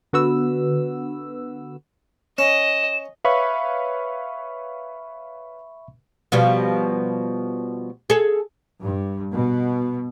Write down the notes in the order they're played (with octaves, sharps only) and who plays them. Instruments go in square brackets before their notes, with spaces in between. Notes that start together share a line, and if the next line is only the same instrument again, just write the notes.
[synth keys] D3 B3 F#4 B4 E6
[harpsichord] C#4 [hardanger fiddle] D#5 [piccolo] E7
[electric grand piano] B4 C#5 F5 [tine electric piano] E5 B5 C#6
[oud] B2 F3 G3
G#4 A4
[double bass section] G2
B2